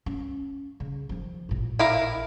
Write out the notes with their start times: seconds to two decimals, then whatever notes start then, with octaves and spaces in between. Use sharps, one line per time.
0.06 C#4
0.80 C#3
1.09 D#3 F3
1.49 A1 A#2
1.79 E4 A#4 F5